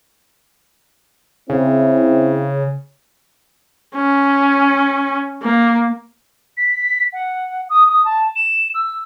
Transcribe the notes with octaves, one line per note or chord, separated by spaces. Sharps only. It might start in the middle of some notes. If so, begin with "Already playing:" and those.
C#3 C4 E4
C#4
A#3
B6
F#5
D#6
D#6
A5
E7
E6